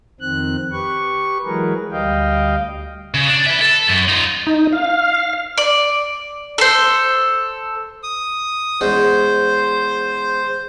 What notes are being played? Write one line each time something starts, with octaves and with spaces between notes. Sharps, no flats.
F2 D#3 C4 F#6
G4 B4 C#6
E3 F#3 G#3 G#4 A#4 B4
D2 G3 D#5 F5 G5
C#3
D4
B4 E5
A4
F#2
D#4 F4
D#4
F5
D5
A4 C5
D#6
E2 G#3 C#4 C5